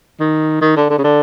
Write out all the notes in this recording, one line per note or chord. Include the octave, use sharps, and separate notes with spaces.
D#3
D#3
D3
D3
C#3
D3